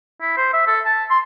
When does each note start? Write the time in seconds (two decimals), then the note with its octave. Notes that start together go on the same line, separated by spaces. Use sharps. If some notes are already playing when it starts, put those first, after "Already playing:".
0.21 E4
0.37 C5
0.53 E5
0.67 A4
0.86 A5
1.10 C6